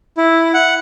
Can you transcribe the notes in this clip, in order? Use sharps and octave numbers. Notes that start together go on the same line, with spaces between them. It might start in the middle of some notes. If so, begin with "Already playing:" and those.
E4
F#5